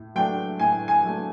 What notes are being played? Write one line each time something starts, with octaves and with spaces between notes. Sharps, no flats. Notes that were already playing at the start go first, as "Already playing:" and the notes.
Already playing: A2
F#3 A3 D4 G5
A2 G#5
G#5
F#3 A3 D4